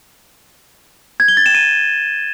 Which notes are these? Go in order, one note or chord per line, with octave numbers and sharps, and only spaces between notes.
G#6
G7
A6
E7
D#7